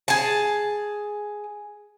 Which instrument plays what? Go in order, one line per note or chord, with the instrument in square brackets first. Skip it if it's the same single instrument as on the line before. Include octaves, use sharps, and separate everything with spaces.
[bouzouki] G#4 A5